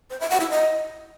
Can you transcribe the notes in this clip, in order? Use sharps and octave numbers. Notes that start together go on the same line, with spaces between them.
C5
E5
F#5
E4
D#5